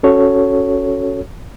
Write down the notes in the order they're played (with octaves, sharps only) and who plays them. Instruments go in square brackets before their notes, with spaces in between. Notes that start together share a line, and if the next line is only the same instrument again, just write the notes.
[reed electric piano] C#4 F#4 A4 C#5